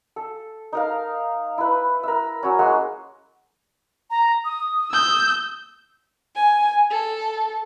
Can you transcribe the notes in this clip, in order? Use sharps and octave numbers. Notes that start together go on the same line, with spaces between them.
A4
D#4 A#4 F5
E4 B4
A#4 E5
F#3 C#4
G#3 A#3 F#4 C6
A#5
D#6
E6 G6
G#5
A4